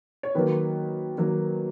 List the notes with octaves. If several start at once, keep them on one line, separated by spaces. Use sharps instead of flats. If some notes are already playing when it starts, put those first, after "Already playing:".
C#5
D#3 F#3 A#3 B4
D#3 F#3 A#3